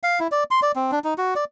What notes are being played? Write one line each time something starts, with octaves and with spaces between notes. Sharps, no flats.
F5
E4
D5
C6
D5
C4
D4
D#4
F#4
D5